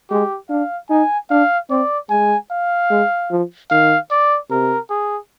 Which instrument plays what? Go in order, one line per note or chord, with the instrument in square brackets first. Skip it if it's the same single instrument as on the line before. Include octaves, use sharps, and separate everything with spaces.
[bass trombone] G#3 [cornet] G4
[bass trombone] D4 [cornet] F5
[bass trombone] D#4 [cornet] G#5
[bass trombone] D4 [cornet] F5
[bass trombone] C4 [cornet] D5
[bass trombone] G#3 [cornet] G#5
[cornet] F5
[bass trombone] G#3
F3
[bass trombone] D#3 [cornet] F5
[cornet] D5
[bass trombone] C3 [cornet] A#4
[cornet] G#4